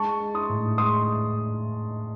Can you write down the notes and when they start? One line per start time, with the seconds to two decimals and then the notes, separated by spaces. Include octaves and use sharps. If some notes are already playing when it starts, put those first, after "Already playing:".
Already playing: G#3 A5 C#6
0.20 G#3
0.35 C6 D#6
0.49 A2
0.78 G#3 C6 D#6